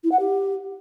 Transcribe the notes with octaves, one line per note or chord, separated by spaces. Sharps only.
E4
F#5
G4